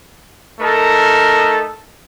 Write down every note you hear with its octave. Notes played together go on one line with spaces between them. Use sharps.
A3 D#4 A4 A#4